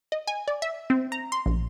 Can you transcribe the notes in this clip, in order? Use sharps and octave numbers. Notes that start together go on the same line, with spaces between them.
D#5
G#5
D5
E5
C4
A#5
C6
A#1